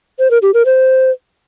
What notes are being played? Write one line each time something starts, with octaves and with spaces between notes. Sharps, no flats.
C5
A#4
G4
A#4
C5